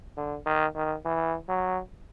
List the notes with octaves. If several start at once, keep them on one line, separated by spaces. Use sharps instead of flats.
D3
D#3
D#3
E3
F#3